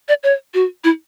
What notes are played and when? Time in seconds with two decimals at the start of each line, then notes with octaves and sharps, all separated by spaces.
0.09 D5
0.23 C#5
0.54 F#4
0.84 E4